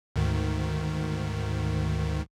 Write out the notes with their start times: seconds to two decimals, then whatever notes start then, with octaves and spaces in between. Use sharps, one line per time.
0.16 D2 G#2 D#3